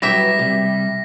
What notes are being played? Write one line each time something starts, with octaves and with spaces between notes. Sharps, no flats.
F#3 G3 B3 E4 G4 E5 A#6 B6
C3 G3